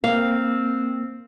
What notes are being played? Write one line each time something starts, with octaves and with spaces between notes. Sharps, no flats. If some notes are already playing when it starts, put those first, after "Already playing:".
A#3 C4 F5